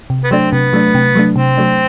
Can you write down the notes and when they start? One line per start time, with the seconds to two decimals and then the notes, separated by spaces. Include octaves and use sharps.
0.10 C3
0.24 B3
0.31 F#3 A3 C4 D4
0.52 C3 B3
0.73 F#3 A3 D4
0.95 C3
1.15 F#3 A3 D4
1.36 C3 C4
1.57 F#3 A3 D4